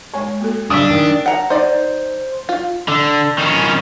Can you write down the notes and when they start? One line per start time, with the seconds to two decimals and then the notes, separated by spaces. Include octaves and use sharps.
0.14 G#3 C#5 G#5 C#6
0.41 A#3 F#4 A4
0.70 C#3 G#3 D4 F5 D#6 E6 B6
0.90 D#3
1.26 F#5 A#5
1.50 D#4 C5 D5
2.49 F4
2.89 D3
3.38 D#3 C#4